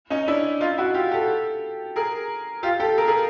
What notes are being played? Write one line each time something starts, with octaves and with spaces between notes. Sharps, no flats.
C#4 D#4
D4 E4
D#4 F4
E4 F#4
F4 G4
G4 A4
G#4 A#4
F4 G4
G4 A4
G#4 A#4
G#4 A#4